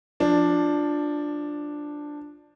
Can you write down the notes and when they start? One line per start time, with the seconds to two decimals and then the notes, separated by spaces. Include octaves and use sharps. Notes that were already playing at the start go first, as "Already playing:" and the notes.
0.20 F3 D4